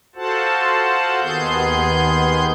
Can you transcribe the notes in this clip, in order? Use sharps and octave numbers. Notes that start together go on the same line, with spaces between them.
F4 F#4 A4 C5 F#5 A5
D#2 D#3 B3 G#4 C6 G6